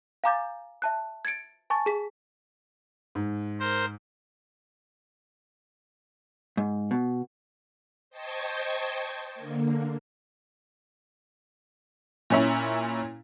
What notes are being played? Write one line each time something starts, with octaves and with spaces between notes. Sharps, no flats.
F5 G#5 A#5 D6 G6 A6
E5 A5 F#6
G#6 A6 C#7 D7
G#5 A5 C#6 A6
G#4 B6
G#2
A#4 C5
G#2
B2
C5 D#5 G5 A5 C#6 G#6
D3 A#3
A#2 C#4 E4